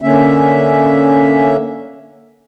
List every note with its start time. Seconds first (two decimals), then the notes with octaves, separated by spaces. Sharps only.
0.02 D3 A#3 C#4 E5